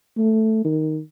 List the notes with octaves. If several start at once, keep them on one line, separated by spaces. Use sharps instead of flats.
A3
D#3